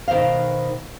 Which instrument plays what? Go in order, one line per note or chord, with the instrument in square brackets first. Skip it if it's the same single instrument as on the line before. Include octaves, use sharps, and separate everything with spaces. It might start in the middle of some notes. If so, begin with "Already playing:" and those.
[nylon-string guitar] B2 D#3 C5 D#5 F5